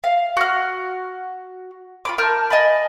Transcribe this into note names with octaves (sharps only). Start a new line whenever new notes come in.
F5
F#4 F6
F4 B5 D6
A#4 A5 F6 G6
D#5 G#5 A5 B5